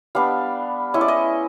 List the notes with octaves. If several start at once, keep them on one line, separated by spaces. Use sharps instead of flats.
G3 B3 D4 F5
G#3 C#4 E4 D#5
D5
D#5